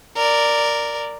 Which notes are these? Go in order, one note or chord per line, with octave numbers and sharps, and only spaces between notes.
A#4 D5